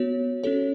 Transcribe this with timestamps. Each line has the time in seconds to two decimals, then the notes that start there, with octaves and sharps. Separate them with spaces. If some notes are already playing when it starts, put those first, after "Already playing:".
Already playing: B3 F#4 C#5
0.43 C#4 F#4 A4 C#5